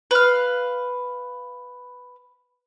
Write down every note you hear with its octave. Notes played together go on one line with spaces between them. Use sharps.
B4 F5